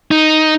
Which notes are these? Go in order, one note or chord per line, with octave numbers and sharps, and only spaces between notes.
D#4